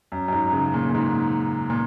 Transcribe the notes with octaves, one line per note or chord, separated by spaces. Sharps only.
F#2
F#2
G#2
C#3
A#2
A#2
G#2
A#2